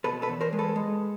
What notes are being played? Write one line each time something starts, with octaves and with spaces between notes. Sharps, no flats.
B2 A4 B4
A4 B4
E2
A#4 C5
G#3
A4 B4
G#3